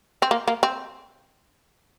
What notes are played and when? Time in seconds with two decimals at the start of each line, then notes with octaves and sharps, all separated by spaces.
0.22 C4
0.31 A#3
0.48 A#3
0.63 C4